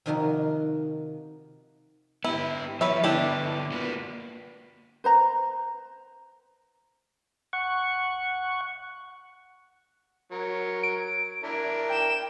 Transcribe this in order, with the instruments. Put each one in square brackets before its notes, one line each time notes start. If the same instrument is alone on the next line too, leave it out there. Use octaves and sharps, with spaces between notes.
[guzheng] C3 D#3 F3 D#4 F#4 A#4
[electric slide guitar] B3 G4 [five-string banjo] E4
[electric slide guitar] F3 G3 [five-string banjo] B4 C#5 E5
[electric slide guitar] D3 B3 [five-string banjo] D4 E4 G4
[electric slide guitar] A#3 F4 B4
[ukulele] B4 C5 A#5
[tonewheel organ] F#5 C#6
[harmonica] F#3 A#4
[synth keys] D7
[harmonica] D4 E4 A#4
[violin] G5 E7